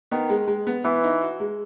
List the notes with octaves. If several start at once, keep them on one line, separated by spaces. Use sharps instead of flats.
D#3 B3
G#3
G#3
B3
E3 B3
D#4
F#4
G#3